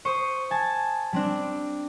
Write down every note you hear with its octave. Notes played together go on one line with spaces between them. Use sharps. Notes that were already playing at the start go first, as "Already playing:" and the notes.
C5 C#6 D#6
G#5 A5
G3 C4 D4